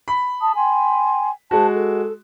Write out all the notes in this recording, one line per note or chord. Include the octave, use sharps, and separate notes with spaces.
B5
A5 D#6
G5 G#5 C6
G#3 F#4 C5 A5
A4